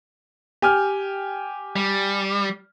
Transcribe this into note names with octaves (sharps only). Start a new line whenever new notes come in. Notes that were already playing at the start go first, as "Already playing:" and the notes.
G4 G#5 F6
G3